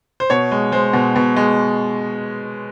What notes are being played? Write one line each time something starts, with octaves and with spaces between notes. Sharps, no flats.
C5
B2 C#5
G#3
G#3 C5
B2
B2
G#3